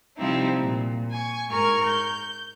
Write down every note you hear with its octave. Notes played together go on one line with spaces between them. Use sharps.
C3 F3 G3 C4 D#4 E4
A#2
G#5 C#6
G#2 A#4 C#6 F6 G#6
G6